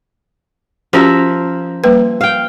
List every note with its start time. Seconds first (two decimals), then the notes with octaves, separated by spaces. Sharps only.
0.93 F3 C#4 F#4 G4 A#4 E5
1.84 G3 A#3 B4
2.21 F5 G5